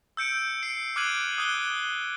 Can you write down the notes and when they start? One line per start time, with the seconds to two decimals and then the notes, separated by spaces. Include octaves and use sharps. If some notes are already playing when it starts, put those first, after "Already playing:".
0.17 E6 G6 C#7 D7
0.63 C7 D7
0.96 D6 F6 F#6 G#6 D#7 F#7
1.38 D#6 F#6 G7